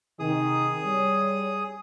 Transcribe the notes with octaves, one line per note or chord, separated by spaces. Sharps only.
C3 D#3 G#4 D#6
G3 C#5